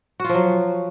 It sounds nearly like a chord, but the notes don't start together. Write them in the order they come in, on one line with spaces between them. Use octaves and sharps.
F#4 F4 F3 F#3